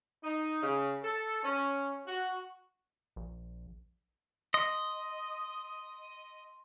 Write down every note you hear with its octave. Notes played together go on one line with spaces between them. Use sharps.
D#4
C#3
A4
C#4
F#4
A#1
D#5 C6